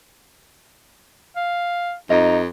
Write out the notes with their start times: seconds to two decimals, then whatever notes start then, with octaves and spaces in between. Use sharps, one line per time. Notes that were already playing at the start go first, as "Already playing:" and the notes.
1.36 F5
2.10 F2 D#4 D#5 F5